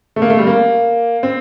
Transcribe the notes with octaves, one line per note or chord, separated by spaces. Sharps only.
A3
A#3
A3
G3
A#3
C4